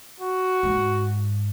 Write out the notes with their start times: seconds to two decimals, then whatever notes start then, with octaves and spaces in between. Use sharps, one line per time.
0.20 F#4
0.63 G#2